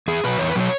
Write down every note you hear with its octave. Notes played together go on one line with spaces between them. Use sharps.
E2 G#4
B2 F#3 B4
E2 C#5
B4
B2 F#3 C#5